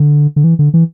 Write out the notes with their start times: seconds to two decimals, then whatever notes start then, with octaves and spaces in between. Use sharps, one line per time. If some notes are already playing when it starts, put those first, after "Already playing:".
Already playing: D3
0.36 D3
0.44 E3
0.59 D3
0.74 E3